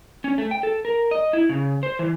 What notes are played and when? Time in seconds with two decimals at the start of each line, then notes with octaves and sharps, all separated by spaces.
0.24 C#4
0.38 A3
0.51 G5
0.63 A4
0.85 A#4
1.11 D#5
1.33 E4
1.49 C#3
1.83 C5
1.99 E3